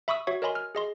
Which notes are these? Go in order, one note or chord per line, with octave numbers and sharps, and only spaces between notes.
E5 B5 C#6 D#6 E6
F#4 C#5 E5 C#6
A#4 C#5 D#5 G#5 B5 C6
F6
G#4 D#5 C6